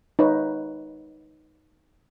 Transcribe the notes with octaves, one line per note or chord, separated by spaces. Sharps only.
D#4 B4 C#5